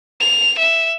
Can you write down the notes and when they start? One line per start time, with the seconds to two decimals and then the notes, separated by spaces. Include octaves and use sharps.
0.20 F7
0.58 E5